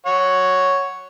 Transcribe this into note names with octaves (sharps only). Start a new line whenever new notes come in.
C#5 F#5